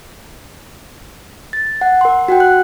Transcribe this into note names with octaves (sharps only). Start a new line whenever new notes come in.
A6
F#5
A#4 C6
F#4 F#5 G5
F#6